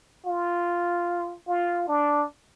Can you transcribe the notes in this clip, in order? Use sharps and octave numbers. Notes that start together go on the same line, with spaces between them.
F4
F4
D4